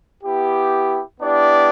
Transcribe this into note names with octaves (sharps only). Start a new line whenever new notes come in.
B3 E4 G4
B3 D4 E4 G4 D5